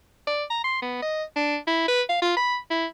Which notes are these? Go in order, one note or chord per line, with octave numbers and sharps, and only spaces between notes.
D5
A#5
C6
B3
D#5
D4
E4
B4
F5
F4
B5
E4